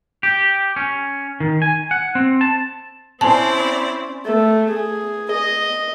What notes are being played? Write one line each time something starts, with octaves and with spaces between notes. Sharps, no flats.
G4
C#4
D#3
G#5
F#5
C4
A5
C4 C#4 E4 C5 D5 G#5 A5
A3
G#4
D#5